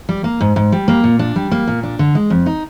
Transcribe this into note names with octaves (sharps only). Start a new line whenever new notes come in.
G3
A#3
G#2
G#2
G3
A#3
A#2
D4
G3
A#3
A#2
D4
D3
G#3
F2
D#4